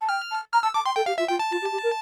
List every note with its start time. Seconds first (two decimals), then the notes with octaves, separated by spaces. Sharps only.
0.01 A5
0.09 G5 F6
0.31 A5
0.53 A#5 F6
0.63 A5 E6
0.74 A5 D6
0.85 G5 C6
0.96 A4 G5
1.06 G4 F5
1.18 F4 E5
1.28 F4 G5
1.39 A5
1.51 F4
1.62 G4
1.72 G4
1.83 A#4